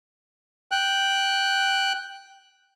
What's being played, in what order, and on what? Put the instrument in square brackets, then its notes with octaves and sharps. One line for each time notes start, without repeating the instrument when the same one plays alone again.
[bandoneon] G5 F#6